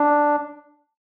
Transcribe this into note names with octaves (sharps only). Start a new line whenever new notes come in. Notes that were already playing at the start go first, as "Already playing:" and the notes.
Already playing: D4